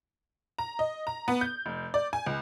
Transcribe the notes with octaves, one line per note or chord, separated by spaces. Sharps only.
A#5
D#5
A#5
B3
G6
F1
D5
G#5
C#2